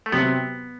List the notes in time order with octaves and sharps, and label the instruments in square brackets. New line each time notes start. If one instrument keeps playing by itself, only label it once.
[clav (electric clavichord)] A3
[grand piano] C3 F#3 C4 G4 [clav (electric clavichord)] B3